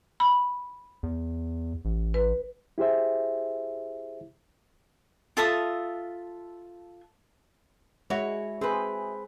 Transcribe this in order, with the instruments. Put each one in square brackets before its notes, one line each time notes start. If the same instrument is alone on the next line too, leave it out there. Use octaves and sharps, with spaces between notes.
[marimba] B5
[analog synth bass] E2
A1
[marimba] B4
[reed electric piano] E4 G4 G#4 C5 E5
[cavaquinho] F4 A4 E5 D#6
[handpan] G#3 [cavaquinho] E4 F#4 [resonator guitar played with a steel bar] C#5
[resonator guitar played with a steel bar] C4 B4 [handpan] G#4